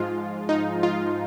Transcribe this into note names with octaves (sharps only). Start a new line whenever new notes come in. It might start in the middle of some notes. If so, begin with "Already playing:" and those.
Already playing: G#2 F3 G#3 F4
D#4
F4